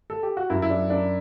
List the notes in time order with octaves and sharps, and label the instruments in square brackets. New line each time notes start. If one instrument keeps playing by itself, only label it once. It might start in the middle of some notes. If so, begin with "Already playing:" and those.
[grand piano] A4
G4
F#4
F#2 E4
E4
F#3 D4
F#2 D4